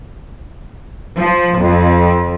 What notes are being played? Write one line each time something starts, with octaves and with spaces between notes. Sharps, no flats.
F3
F2